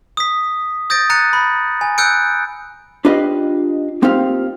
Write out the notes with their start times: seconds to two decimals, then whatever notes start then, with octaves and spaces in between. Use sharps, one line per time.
0.17 D#6 B6
0.90 D#6 G6 A6 A#6 D7
1.10 A#5 F#6 A6 C#7 D#7
1.33 B5
1.81 G#5
1.98 E6 F#6 G6 C#7 D7
3.05 D4 F4 G4 B4 D#5 F5
4.02 A#3 C4 D#4 F4 G4 F5